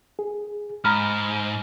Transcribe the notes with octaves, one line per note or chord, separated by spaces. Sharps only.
G#4
G#2 A#5 B5 F6